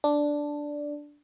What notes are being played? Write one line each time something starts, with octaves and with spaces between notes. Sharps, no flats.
D4